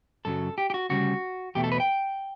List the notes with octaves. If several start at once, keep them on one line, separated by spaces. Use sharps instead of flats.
F#2 C#3 F#3 A4
G4
G4
F#4
D2 C#3 G3 F#4
E2 B2 A3 G4
A4
B4
G5